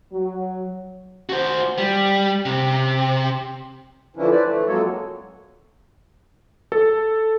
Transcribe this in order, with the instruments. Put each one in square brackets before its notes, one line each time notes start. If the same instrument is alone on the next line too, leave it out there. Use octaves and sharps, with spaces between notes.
[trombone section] F#3
[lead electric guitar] F#4 C5
G3
C3
[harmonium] D3 E3 F3 C#4 D4 E4
E4 B4 C5 D5
E3 A3
F2 F#3 G#3 A#3 A4 C#5
[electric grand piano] A4